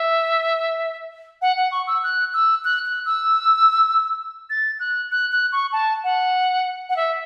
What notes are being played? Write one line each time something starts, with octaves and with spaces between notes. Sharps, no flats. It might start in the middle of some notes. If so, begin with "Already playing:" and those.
Already playing: E5
F#5
F#5
C#6
E6
F#6
E6
F#6
F#6
E6
A6
F#6
F#6
F#6
C#6
A5
F#5
F#5
E5